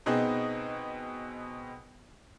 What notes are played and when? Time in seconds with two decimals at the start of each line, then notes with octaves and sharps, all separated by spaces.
0.06 B2 B3 C4 D#4 G#4